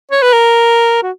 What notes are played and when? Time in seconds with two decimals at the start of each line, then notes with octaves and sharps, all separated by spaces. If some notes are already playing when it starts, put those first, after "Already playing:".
0.11 C#5
0.22 B4
0.33 A#4
1.03 F#4